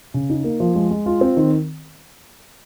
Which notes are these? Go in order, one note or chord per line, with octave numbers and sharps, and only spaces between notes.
C#3
D#4
A#3
F3
G#3
G#3
F4
C4
D#3